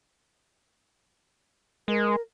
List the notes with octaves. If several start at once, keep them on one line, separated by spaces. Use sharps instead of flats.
G#3 A#4